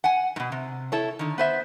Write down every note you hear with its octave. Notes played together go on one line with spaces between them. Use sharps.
F#5 G#5
G#2 B2
C3
E4 A4 C#5
D3 D#3
B3 C5 E5